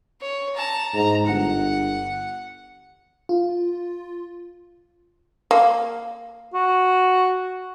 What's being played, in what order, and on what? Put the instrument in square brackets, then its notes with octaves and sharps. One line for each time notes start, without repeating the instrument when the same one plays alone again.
[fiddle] C#5
A5 A#5
[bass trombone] G#2 [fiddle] A#5
[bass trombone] G1 [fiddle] F#5
[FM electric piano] F4
[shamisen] A#3
[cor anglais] F#4